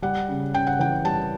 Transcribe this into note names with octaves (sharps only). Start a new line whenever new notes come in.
G3 F#5
C#3
C#3 G5
F#5
E3 G5
G3 A5